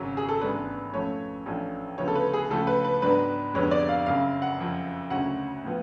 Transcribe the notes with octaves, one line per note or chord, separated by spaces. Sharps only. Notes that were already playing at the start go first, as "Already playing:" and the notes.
Already playing: G#1 F#2 C#3 F#3
G#4
A4
A1 G#2 G#3 B3 D4 B4
F2 F3 A3 C#4 C#5
A1 A2 F3 A3 D4
D2 C#3 F3 B3 C#5
A4
B4
G#4
C#2 C#3 F3 A3 A4
B4
B4
G#2 F#3 B3 D4 B4
F1 F2 D3 G#3 B3 C#5
D5
F5
F#1 F#2 C#3 F5
F#5
F#1 F2 F3
D2 C#3 F#3 C#4 F#5
A2 F3 B3